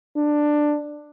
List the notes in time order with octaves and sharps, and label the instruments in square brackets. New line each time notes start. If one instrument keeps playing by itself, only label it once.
[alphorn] D4